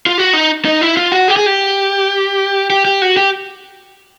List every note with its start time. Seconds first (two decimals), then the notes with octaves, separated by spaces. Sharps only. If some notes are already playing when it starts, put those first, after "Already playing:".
0.06 F4
0.18 F#4
0.33 D#4
0.65 D#4
0.81 E4
0.97 F4
1.12 F#4
1.28 G4
1.37 G#4
1.46 G4
2.70 G4
2.85 G4
3.02 F#4
3.17 G4